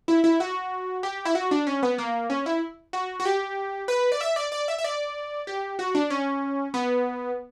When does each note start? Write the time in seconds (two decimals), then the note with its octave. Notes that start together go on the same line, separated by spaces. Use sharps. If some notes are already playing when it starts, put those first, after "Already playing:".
0.08 E4
0.24 E4
0.40 F#4
1.03 G4
1.25 E4
1.35 F#4
1.51 D4
1.67 C#4
1.83 B3
1.98 A#3
2.30 C#4
2.46 E4
2.93 F#4
3.20 F#4
3.25 G4
3.88 B4
4.12 D5
4.21 E5
4.36 D5
4.52 D5
4.68 E5
4.78 E5
4.84 D5
5.47 G4
5.79 F#4
5.95 D4
6.10 C#4
6.74 B3